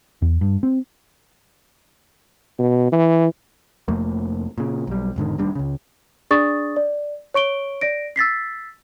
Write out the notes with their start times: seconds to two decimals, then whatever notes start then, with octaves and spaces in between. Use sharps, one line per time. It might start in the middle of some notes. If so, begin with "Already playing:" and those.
0.22 E2
0.41 G2
0.63 C4
2.59 B2
2.92 E3
3.88 F1 F2 A3 A#3
4.58 A#2 C#3
4.87 B1 G3
5.16 E1 G#2 D3 D#3
5.38 F1 D#2 G3 D4
5.55 C#2 C#3
6.31 D4 G#4 D5 C#6 D#6 A6
6.76 D5
7.34 C#5 C#6 D7 G7
7.81 D5 A#6 D7
8.16 E6 A6 B6 C7